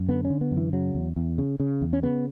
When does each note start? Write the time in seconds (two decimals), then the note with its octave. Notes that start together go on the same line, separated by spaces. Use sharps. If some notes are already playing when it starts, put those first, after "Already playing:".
Already playing: F#2
0.08 D3 B3
0.25 C#4
0.30 D3
0.41 B3
0.51 F#2
0.57 E3
0.73 C#3 F#3
0.95 E2
1.16 E2
1.38 C#3
1.60 C#3
1.82 E2
1.93 C#4
2.03 C#3 B3